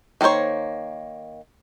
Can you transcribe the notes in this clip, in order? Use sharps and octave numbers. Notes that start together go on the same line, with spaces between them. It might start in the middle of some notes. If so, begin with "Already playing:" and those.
D#3 A#3 F4 C5 C#5